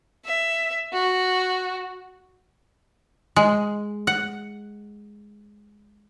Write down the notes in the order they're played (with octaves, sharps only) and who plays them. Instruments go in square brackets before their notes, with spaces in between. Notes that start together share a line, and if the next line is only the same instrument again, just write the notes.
[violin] E5
F#4
[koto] G#3
F#5